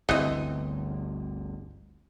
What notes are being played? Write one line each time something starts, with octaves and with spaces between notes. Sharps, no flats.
G1 D2 E3 C4 D#5